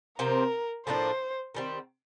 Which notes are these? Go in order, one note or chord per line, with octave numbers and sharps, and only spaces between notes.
C3 F3 C4 G4 A#4
A2 F3 A#3 D4 C5
D#3 G3 C4